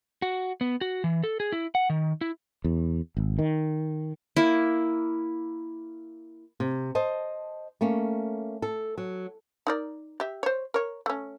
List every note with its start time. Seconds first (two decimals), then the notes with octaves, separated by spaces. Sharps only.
0.22 F#4
0.61 B3
0.81 F#4
1.04 E3
1.24 A4
1.40 G#4
1.52 E4
1.75 F#5
1.90 D#3
2.21 E4
2.64 E2
3.17 G#1
3.39 D#3
4.37 A#3 E4
6.60 C3
6.95 C5 D#5 A5
7.81 A3 A#3 C#4
8.62 A4
8.98 F#3
9.67 D#4 A#4 D5
10.20 G4 E5
10.43 C5 C#5
10.74 A#4 C#5
11.06 A3 C#4